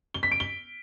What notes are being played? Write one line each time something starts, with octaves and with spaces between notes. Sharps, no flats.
G7
B6
D7
G7